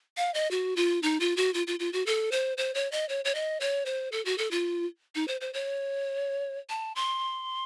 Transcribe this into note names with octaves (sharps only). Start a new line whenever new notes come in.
F5
D#5
F#4
F4
D#4
F4
F#4
F4
F4
F4
F#4
A4
C5
C5
C#5
D#5
C#5
C#5
D#5
C#5
C5
A4
F#4
A4
F4
D#4
C5
C5
C#5
A5
C6